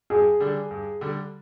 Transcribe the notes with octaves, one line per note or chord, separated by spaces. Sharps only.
G2 G#4
D3 G3 D4
G2
D3 G3 D4